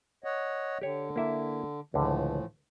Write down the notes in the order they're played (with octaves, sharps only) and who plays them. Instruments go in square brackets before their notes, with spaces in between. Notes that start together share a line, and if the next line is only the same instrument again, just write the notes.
[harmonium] C#5 D#5 F#5
[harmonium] D3 [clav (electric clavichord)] G4 C#5
[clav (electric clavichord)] A#3 E4 E5
[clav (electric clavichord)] C#2 D3 [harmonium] A2 E3 F3